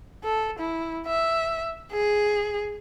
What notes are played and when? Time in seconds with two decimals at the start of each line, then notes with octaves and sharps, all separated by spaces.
0.24 A4
0.59 E4
1.07 E5
1.92 G#4